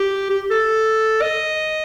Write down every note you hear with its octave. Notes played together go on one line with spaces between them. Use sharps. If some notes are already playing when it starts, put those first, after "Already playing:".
Already playing: G4
G4
A4
D#5